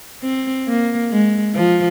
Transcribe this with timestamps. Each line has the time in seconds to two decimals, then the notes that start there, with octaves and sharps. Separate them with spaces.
0.22 C4
0.67 A#3
1.11 G#3
1.55 F3